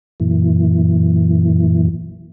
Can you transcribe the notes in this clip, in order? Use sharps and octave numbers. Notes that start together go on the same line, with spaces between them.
F#2 A#2 E3